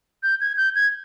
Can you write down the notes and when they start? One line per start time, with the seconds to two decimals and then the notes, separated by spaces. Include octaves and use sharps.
0.23 G6
0.41 G#6
0.57 G6
0.75 G#6